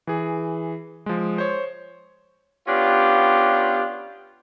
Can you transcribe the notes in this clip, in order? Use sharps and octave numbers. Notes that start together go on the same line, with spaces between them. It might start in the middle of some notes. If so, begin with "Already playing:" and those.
E3 G#4
F3 G#3
C5 C#5
B3 C#4 D4 F4 G4